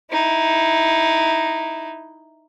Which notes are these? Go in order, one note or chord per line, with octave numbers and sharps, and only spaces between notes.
D#4 E4